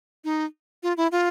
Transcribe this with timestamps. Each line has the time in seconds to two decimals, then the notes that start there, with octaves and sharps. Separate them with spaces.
0.24 D#4
0.83 F4
0.97 E4
1.12 F4